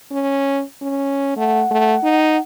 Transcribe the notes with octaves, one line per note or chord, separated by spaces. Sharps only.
C#4
C#4
A3 F#5
A3
D#4